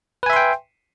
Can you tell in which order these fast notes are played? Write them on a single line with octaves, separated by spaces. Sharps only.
B4 G#5 E5 C6 G5